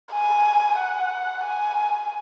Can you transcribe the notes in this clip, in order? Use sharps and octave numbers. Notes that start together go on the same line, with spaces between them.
G#5
F#5
G#5